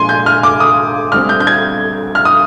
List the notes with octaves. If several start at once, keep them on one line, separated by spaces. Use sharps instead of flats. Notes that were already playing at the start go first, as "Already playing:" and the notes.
Already playing: A#2 F3 G#3 D4 G#5 C6
G6
F6
D6
D#6
D3 G3 C4 F6
G6
G6
G#6
F6
D#6